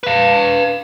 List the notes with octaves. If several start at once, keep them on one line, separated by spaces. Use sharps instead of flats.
B4 F5